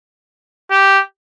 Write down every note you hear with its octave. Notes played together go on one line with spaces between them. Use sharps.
G4